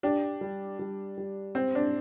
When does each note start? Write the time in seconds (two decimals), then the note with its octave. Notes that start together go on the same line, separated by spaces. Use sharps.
0.03 D4 G4
0.41 G3
0.79 G3
1.17 G3
1.55 C4 C5
1.75 D4